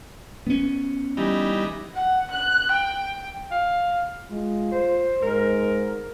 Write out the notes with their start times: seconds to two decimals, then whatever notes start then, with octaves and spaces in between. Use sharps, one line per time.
0.47 B3 C#4
1.17 E3 G3 D#4
1.94 F#5
2.31 F#6
2.72 G5
3.51 F5
4.30 G#3 F4
4.72 C5
5.22 G#2 A#4